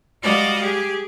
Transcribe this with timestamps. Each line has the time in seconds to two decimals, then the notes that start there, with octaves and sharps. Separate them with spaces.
0.22 G3 G#3 F#4 D5 D#5 F5
0.60 G4 G#4